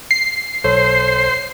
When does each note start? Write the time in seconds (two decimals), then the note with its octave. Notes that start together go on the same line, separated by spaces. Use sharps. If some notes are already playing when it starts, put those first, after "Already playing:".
0.11 C7
0.64 B1 A4 C5 C#5